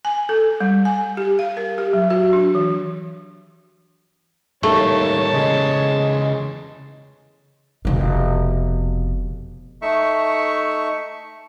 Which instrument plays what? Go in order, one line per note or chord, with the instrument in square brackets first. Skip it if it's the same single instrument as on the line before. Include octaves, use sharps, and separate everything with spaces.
[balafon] G#5
A4
G3
G#5
G4
F5
A#4
G4
F#3
F#4
D4
E3
[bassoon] D#2 [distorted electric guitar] A2 G3 [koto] A3 [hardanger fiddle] C#5 A5
[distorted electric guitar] C#3 E3 [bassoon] G#3
[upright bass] F1 B2
[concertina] A3 D#4 E5 C#6